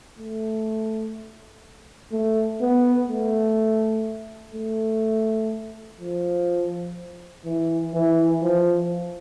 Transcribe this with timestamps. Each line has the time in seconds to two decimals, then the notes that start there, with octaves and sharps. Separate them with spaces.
0.18 A3
2.12 A3
2.61 B3
3.09 A3
4.54 A3
6.00 F3
7.45 E3
7.94 E3
8.42 F3